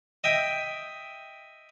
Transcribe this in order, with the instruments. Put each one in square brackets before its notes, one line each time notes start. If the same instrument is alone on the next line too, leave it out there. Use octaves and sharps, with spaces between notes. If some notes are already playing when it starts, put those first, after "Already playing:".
[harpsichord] D#5 E5 G5